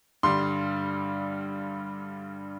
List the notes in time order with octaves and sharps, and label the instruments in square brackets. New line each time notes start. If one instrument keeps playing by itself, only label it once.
[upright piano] G2 D3 G3 C6